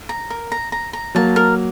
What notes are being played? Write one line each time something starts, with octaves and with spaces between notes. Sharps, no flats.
A#5
A#4
A#5
A#5
A#5
F#3 A#3 A5
A#4